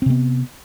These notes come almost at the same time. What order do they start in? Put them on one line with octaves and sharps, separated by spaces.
C4 C3 B3